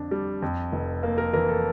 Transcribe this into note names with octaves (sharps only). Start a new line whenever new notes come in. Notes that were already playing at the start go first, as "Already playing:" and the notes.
Already playing: F2 D3 D4
G3
F2
F1
A#3
A#4
E3 A#4
A4